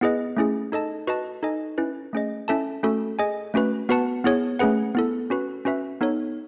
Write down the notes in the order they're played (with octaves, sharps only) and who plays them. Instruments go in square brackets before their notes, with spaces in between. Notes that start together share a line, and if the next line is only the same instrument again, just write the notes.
[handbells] B3 E4 G#4 B4 D#5
A3 C#4 E4 G#4
D#4 A4 D#5 A5
F#4 B4 D#5 A5
D#4 A4 D#5 G#5
C#4 E4 B4
A3 C#4 G#4 D#5
C#4 E4 A4 E5 A5
A3 C#4 F#4 A4
G#4 D#5 G#5
A3 C#4 F#4 B4
B3 F#4 B4 F#5 A5
B3 E4 G#4 C#5
A3 C#4 G#4 B4 F#5
B3 E4 A4
C#4 F#4 B4
C#4 F#4 B4 E5
B3 D#4 A4 C#5